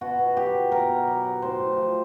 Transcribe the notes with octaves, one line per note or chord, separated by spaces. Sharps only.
B2 F#4
B2
F#3 G4
F#3
B2 A#4
B2
F#3
F#3
A2 C5
A2
F3